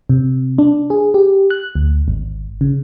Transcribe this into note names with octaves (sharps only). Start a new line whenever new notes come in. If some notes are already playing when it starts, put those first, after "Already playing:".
C3
D4
G#4
G4
F#6
D2
G#1
C#3